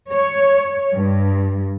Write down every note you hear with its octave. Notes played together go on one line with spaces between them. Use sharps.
C#5
G2